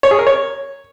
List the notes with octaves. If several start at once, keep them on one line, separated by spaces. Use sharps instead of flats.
C#5
G#4
A#4
C#5